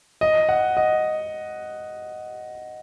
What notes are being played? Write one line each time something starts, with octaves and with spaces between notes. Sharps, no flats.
D#5
F#5
D#5